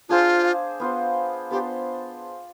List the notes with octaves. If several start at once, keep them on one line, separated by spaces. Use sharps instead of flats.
D4 F4 G#4 C5 F5
B3 F4 C5
B3 D4 F4 G4 C5